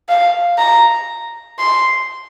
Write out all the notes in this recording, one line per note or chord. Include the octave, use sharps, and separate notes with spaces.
F5
A#5
C6